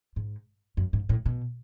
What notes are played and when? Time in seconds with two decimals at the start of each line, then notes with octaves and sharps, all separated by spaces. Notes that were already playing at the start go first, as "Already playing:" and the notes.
0.16 G#2
0.77 F#2
0.93 G#2
1.09 A2
1.26 B2